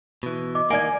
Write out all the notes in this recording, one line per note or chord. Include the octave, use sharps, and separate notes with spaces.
B2 E3
D#5 D6
D#3 A#3 D5 G#5 G#6 D7